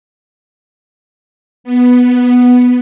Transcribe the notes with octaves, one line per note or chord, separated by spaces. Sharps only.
B3